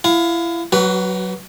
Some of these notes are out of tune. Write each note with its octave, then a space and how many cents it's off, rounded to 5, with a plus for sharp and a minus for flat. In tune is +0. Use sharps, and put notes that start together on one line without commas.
E4 +30 F5 +20
F#3 +10 F#4 +45 B4 +0